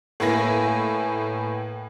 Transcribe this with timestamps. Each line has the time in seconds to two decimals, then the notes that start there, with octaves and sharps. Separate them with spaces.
0.20 A2 A#3 E4 B4 G#5 A#6